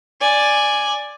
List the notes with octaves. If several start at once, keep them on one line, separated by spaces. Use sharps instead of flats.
D5 G#5